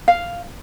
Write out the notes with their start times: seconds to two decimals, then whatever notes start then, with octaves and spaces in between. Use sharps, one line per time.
0.08 F5